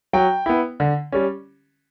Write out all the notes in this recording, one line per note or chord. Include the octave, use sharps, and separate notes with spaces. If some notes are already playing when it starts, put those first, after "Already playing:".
F#3 G5
B3 E4
D3
G3 C#4